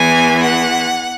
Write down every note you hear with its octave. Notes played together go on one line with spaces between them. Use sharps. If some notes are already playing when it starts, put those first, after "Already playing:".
Already playing: E2 E3 G#5
F#5